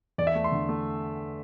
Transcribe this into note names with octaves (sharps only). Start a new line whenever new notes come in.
E2 D5
E5
A3
C6
D3
A3